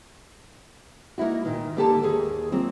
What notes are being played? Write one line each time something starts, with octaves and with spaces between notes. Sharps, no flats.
A#3 D#4 E4 F#4
A#2 D#3
D3 A#3 G4 A4 B4 A5
D#2 G#4
F#3 A#3 C4 F4